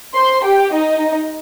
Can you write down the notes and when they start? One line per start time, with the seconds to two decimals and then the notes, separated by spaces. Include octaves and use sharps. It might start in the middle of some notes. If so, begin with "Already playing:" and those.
0.15 C5 C6
0.44 G4 G5
0.74 D#4 D#5